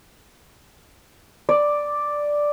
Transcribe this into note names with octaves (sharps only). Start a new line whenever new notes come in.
D5